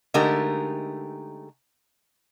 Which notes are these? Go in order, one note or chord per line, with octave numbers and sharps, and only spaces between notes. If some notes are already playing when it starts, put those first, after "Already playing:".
D3 G#3 A3 D#4 G4 A#4